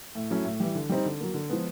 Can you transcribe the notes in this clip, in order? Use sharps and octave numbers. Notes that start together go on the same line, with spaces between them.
A2
F#3 A3 C#4 E4
A2
E3 G3
D3
G3 C4 D#4
D3
F#3 A#3
D3
F3 G#3 B3